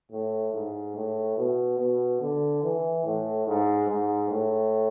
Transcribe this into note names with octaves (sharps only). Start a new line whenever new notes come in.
A2
G#2
A2
B2
B2
D3
E3
A2
G#2
G#2
A2